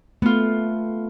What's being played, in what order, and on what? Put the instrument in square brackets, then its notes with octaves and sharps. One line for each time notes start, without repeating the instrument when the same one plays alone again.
[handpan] A3 [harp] B3 F4